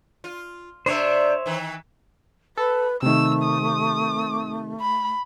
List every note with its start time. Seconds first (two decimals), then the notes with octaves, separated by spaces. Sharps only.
0.24 F4
0.86 C3 D4 C5 C#5 E5
1.46 D#3 E3
2.58 A4 B4 B5
3.02 C3 D#3 A3 E6
3.44 D#6
4.81 B5